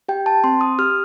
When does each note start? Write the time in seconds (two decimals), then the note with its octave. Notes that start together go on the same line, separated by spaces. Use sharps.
0.08 G4 G5
0.26 A5
0.44 C4 C6
0.61 D#6
0.79 G4 F6